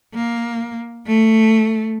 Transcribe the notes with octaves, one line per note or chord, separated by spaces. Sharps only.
A#3
A3